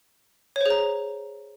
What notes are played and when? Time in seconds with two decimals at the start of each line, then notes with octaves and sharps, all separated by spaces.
0.56 C#5
0.61 C5
0.66 G#4
0.70 A#5